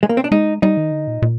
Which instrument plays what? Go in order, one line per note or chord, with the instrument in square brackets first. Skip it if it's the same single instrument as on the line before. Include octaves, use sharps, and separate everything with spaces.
[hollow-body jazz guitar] G#3
A#3
C4
D4
[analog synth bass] G#3 [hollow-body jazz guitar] D#4
[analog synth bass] G3 [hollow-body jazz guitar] D#4
[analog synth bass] D#3
D3
A#2
A#2